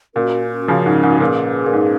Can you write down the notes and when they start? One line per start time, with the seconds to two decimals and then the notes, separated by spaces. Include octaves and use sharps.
0.15 A#2 C#4 F#4 A#4
0.68 C#3 F3
0.86 G#2
1.03 G#2
1.20 A#2 C#4 G#4 B4
1.66 A#2
1.73 G#2